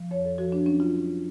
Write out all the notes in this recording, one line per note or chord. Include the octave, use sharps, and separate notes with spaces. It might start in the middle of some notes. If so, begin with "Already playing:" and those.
Already playing: F3
F2 C#5
A4
F3 F#4
D4
F#3 C#4
F4